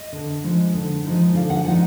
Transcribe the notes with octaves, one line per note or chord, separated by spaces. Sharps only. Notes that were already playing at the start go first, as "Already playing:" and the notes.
Already playing: D#5
D3
F3 G#3 D#4
D3
F3 G#3 D#4
D3 F5
F#5
F3 G#3 D#4 F#5